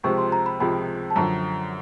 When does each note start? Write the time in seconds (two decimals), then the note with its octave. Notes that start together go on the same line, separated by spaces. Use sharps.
0.03 C#2 C3 F3 G#3 C#6
0.18 C6
0.32 A#5
0.46 B5
0.60 C#2 C3 F3 G#3 B5
1.10 A5
1.16 F#2 D3 F3 A#5